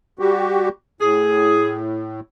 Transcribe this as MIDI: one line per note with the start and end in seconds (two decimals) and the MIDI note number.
0.19 0.69 55
0.19 0.69 66
0.19 0.69 67
1.01 2.20 45
1.01 1.80 68